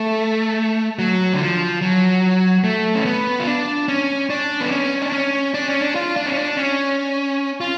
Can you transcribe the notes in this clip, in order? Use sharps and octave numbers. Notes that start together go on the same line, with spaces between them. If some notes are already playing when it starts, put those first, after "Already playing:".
Already playing: A3
F#3
D3
F3
F#3
A3
C#4
B3
F4
D4
C#4
D4
B3
C#4
D4
C#4
D4
C#4
D4
F4
D4
C#4
D4
C#4
F4